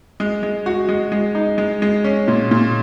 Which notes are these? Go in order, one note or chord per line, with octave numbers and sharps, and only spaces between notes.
G#3
G#3
F#4
G#3
G#3
D#4
G#3
G#3
C#4
A#2
A#2